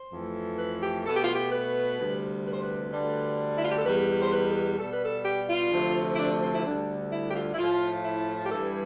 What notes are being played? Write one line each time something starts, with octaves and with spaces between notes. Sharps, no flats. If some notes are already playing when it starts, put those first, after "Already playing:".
Already playing: C5
F2 E3 A3
B4
G4
B2 A3 A4
G4
F4
G4
B4
D2 C3 G3
B4
C5
B4
D2 D3 G3
E4
F4
G4
A4
E2 B2 G3 B4
C5
B4
A4
B4
B2 G3 A4
B4
A4
G4
F4
D2 C3 F3 A3
E4
D4
C4
E4
D2 D3 G3 D4
E4
G4
F4
E4
A2 F3 A3 F4
E4
G4
G2 E3 G3 A4